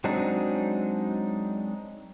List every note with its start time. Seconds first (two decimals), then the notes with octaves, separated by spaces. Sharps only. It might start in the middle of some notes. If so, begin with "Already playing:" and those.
0.04 F#3 G#3 C4 D4 D#4